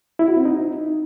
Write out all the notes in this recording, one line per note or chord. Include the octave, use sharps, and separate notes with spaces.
E4
F#4
C4
D#4